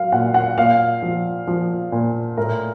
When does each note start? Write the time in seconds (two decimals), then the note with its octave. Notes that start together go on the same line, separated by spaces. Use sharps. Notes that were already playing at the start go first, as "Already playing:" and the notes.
Already playing: F#3 F5
0.12 A#2 F#5
0.34 F#5
0.57 A#2 F5
1.02 F3
1.47 F3
1.92 A#2
2.37 A2 A#4